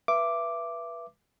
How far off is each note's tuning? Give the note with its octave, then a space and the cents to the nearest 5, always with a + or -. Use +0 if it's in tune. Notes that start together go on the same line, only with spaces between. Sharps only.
B4 -20 E5 +30 D6 +0